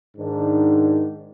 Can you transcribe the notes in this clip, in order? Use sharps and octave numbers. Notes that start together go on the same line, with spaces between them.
G#2 D#3 D4